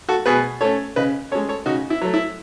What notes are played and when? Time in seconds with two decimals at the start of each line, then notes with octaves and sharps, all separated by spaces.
0.09 F#4 A4
0.26 B2 G#4 B4
0.61 A3 C#4 A4 C#5
0.96 C#3 B4 D#5
1.31 G#3 C#4 A4 C#5
1.49 A4 C#5
1.66 C#3 D#4 F#4
1.90 E4
2.01 F#3 A3
2.14 E4